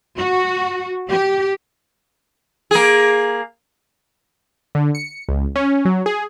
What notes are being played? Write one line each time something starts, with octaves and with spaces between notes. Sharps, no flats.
F#4
G4
A#3 G#4
D3
C#7
C#2
C#4
F#3
G#4